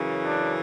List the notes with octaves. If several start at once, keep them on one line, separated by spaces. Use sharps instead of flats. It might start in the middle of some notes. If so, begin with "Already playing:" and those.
Already playing: F#2 C#3 E3
D4